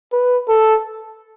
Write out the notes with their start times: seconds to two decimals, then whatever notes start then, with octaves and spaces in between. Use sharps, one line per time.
0.12 B4
0.48 A4